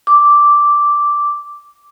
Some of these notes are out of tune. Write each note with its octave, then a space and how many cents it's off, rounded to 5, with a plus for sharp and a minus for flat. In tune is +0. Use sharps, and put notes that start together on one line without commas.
D6 -5